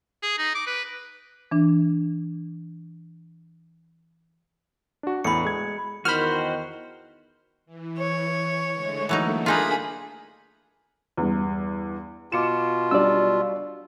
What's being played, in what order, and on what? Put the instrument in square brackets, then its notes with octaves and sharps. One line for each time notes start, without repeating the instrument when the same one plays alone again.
[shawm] G#4
D#4
D6
B4
[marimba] E3 D4
[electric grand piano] D4 F#4
[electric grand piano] E2 A2 [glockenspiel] B5 C#7
[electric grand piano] G#3 G#6
[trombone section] E2 D#3 [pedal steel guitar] F#4 C5 [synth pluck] B5 F6
[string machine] E3
[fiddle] C#5
[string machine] D3 G#3 A3
[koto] E3 F#3 D#4 [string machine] A3 A#3
[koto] D4 D#4 F4 [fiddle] G#4 B5
[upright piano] E2 G2
[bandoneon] B2 F4 [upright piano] D6 C#7 E7
[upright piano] F#3 G3 D4 [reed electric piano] D5 E6